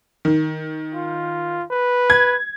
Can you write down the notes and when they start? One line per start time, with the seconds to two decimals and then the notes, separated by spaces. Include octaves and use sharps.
0.25 D#3
0.95 F4
1.71 B4
2.10 G#6